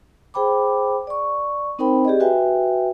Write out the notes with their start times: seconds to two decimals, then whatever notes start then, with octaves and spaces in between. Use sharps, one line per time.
0.34 G#4 C5 G5 B5 D6
1.07 D5 C#6
1.79 C4 D#4 A#4 C5 G5 B5
2.05 G4 G#4 D5 D#5
2.20 F#4 B4 E5 G5 G#5